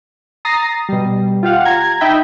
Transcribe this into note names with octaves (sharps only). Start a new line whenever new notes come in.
A#5 D#6 A6 A#6 C7
B2 G3
F4 G4 F5 F#5
A#5 G#6
D#4 D#5 E5 G5 B5